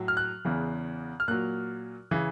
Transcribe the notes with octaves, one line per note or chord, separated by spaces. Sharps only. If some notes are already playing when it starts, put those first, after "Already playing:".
Already playing: A2 F#3
F6
F#6
E2 C#3 E3
F6
A#2 F#3 F#6
C#3 E3